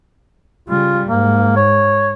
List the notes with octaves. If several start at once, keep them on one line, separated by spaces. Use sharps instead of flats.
C#3 G3 F4
G#2 A#3
C#5